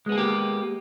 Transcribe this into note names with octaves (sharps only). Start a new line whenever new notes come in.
G#3 A#3 B3 G4 G#4